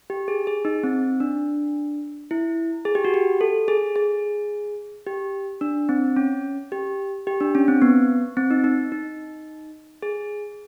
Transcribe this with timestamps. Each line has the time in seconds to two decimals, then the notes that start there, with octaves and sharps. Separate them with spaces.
0.10 G4
0.28 G#4
0.47 G#4
0.65 D#4
0.83 C4
1.20 D4
2.31 E4
2.85 G#4
2.95 G4
3.05 F#4
3.14 G4
3.41 A4
3.68 G#4
3.96 G#4
5.06 G4
5.61 D4
5.89 C4
6.16 C#4
6.72 G4
7.27 G4
7.40 D4
7.55 C#4
7.68 C4
7.82 B3
8.37 C4
8.51 D#4
8.64 D#4
8.92 D#4
10.02 G#4